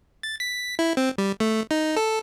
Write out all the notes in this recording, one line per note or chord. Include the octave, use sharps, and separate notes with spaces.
A6
B6
E4
C4
G3
A3
D#4
A4